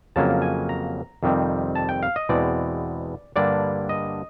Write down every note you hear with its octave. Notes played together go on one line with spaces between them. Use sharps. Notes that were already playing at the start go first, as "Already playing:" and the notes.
F2 C#3 F#3 A#3 C#4 A5
G#5
A#5
F2 C3 D#3 G3 C4
A5
G5
F5
D#5
E2 B2 G#3 C4 D5
G2 D3 G3 A#3 D4 D5
D#5